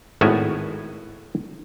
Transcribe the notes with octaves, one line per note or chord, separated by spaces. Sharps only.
G#1 A2 B3 F#4 A#4 G#5